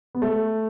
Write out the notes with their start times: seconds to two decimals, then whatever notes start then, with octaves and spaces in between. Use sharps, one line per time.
0.15 B3
0.22 A3